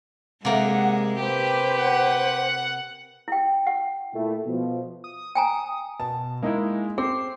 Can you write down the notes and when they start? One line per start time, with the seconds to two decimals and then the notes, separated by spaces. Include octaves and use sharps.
0.45 C3 G#3 A#3 F#5
1.21 G4 B4 C5
1.79 F#5
3.28 E4 G5
3.67 F#5
4.14 A#2 A3 E4
4.46 B2 F3
5.04 D#6
5.35 G5 G#5 A#5
6.00 B2 A5
6.43 G#3 A#3 D#4 E4
6.98 C4 G#4 C7